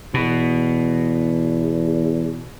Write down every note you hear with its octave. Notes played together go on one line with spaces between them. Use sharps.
E2 B2